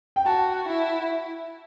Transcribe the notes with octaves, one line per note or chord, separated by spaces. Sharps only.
G5
F#4 A5
E4